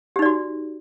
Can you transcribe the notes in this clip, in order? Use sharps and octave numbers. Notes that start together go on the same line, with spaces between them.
D#4 F#4 G4 D5